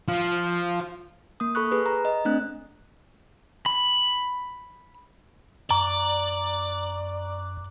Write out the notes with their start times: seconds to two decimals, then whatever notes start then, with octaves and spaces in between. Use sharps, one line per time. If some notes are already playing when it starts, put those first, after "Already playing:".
0.09 F3
1.40 A#3 D#6
1.55 A4 B5 C#6 F#6
1.72 G#4 B4
1.86 A#5
2.05 D#5
2.25 A3 C4 D4 F#6
3.66 B5
5.71 F#2 D5 A#5